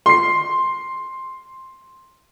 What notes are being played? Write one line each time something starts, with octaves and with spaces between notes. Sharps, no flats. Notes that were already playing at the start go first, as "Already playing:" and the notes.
C6 C7